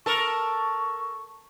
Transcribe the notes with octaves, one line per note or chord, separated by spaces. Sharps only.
A4 A#4 C#6